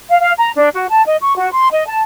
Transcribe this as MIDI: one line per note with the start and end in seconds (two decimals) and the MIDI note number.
0.09 0.16 77
0.20 0.31 77
0.38 0.49 82
0.56 0.68 62
0.74 0.86 66
0.89 1.03 81
1.05 1.16 75
1.21 1.35 85
1.36 1.49 66
1.52 1.67 84
1.71 1.86 75
1.87 2.00 81